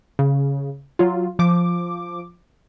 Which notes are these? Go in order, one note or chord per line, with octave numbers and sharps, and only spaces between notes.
C#3
F#3 F4
F3 D6